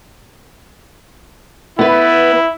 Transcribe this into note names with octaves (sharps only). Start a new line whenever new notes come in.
B3 E4 B4